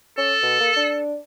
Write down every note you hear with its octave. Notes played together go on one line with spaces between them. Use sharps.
C#4 A4
B2
A#3
D4